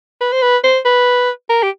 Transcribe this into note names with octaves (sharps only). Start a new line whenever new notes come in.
B4
C5
B4
C5
B4
A#4
G4